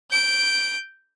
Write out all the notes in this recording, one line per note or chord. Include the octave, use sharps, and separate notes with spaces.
G6 D7